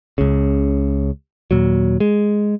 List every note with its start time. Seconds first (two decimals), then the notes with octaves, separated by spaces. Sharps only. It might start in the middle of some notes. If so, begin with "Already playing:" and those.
0.18 C#2 C#3
1.51 D#2 A#2 F#3
2.00 G#3